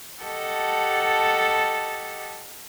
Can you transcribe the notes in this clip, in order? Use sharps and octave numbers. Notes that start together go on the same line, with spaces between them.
G4 A4 D#5 F#5 A5